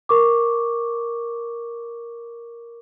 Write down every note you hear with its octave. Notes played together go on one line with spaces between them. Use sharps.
A#4 C#6 D6